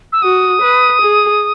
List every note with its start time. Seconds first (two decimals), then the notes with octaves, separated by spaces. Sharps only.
0.12 E6
0.22 F#4 D#6
0.62 B4
1.02 G#4